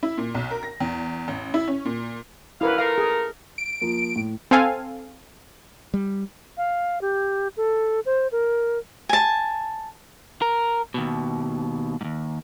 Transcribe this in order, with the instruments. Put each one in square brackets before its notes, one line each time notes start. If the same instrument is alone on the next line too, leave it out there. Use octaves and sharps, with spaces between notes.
[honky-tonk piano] E4
A#2
B1
A#4
A#6
E2
A1
E4
C#4
A#2
[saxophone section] F#2 D3 F5 [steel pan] E4 A#4 B4
[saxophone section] A3 F4 A#4 [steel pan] F5
[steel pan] G#4
[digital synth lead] D7
[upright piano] F3 A#3
A2
[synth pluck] C4 A4 F5 G#5
[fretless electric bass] G3
[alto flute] F5
G4
A4
C5
A#4
[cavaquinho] G#5 A5
[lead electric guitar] A#4
D#2 B2
D#2 G#2